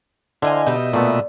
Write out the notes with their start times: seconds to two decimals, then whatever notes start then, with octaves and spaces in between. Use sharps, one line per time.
0.42 D3 E4 C5 D#5 F5 G#5
0.66 B2 G3 D#4 D#5 E5
0.93 A#2 A3 B3 D4